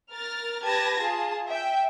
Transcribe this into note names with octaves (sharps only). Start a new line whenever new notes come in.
A#4 F6 A6
G4 B4 A5 G#6 A#6
F4 G#4 A5
E5 G5